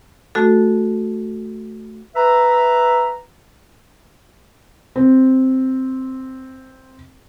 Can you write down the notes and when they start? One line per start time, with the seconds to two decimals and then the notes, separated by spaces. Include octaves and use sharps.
0.35 A3 F#4 A4
2.16 B4 E5 A#5
4.96 C4 C5